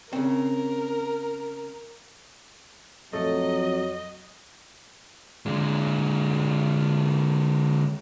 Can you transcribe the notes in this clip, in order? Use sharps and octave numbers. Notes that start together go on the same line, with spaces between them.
C#3 C4 A#4
F2 F#3 A3 A4 D#5
D3 G#3